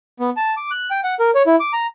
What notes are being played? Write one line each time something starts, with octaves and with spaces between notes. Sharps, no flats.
B3
A5
D6
F#6
G5
F#5
A#4
C#5
E4
D6
A#5